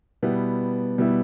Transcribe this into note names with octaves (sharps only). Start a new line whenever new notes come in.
B2 G3 B3 E4
B2 G3 B3 E4